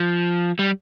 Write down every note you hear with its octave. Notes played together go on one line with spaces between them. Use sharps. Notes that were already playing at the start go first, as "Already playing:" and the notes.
Already playing: F3
G3